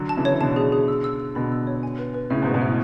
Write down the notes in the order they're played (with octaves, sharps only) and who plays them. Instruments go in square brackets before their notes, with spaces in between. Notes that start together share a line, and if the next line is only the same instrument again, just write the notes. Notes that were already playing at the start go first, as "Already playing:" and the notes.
Already playing: [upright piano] D3 F#3
[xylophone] A5
[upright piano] C#3 E3
[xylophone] C#5
[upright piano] E3
[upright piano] B2 D3 [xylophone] A5
[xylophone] G#4
G#4
E6
E6
E6
[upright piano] B2 D3 [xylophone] B5
[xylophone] E6
C#5
G#5
B4
B4
[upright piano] A2 C#3 [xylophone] E5
[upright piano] G#2 B2
[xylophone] B4
[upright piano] G#2 B2
[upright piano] A2 [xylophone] E5